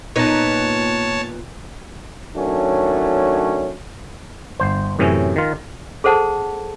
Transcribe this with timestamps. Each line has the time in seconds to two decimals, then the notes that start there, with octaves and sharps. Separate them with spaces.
0.16 A#2 B3 D#4 C#5 A5
2.35 D#3 F#3 A3 C#4 D4
4.60 G1 C5
4.99 F#2 A2 C3 E3 C#4
5.36 D#3 F4
6.04 G#4 A4 C5 F#5 A5